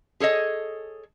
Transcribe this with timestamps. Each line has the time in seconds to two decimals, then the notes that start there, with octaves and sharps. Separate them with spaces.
0.20 G#4 A4 C#5 D#5